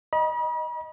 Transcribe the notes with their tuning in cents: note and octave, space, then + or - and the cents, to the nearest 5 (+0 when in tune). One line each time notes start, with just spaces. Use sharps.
D#5 +0 B5 -45